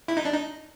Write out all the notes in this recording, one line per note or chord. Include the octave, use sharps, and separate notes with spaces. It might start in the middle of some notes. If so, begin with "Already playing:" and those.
E4
D#4
D4
D#4